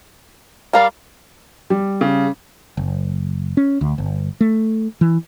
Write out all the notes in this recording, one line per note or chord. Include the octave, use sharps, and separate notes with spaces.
G3 A#4 D5 F5
G3
C#3
F#1
C#4
D2
G1
A3
E3